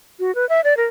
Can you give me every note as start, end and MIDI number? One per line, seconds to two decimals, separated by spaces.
0.20 0.34 66
0.35 0.48 71
0.49 0.61 76
0.64 0.76 74
0.77 0.84 70